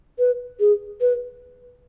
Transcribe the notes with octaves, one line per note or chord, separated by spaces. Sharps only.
B4
G#4
B4